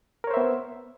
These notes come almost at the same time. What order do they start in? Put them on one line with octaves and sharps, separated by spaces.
A#4 C#5 C5 E5 B3